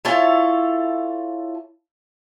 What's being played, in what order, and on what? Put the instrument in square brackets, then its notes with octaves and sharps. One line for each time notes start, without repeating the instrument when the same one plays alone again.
[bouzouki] E4 F4 A4 C#5